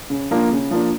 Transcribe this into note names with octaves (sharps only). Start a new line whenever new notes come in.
C#3
F3 A#3 D4
C#3
F3 A#3 D4